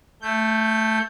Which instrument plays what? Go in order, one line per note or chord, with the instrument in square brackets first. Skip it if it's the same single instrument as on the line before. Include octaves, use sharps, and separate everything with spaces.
[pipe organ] A3 G6